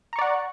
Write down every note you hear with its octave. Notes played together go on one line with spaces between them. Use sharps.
D5 F#5 A#5 C#6